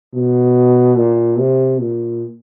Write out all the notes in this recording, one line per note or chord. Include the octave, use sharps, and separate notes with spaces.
B2
A#2
C3
A#2